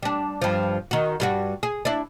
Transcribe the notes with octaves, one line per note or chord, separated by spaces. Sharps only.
G3 D4
G2 F3
D#3 F#4
G2 G3 F#4
G#4
D4 E4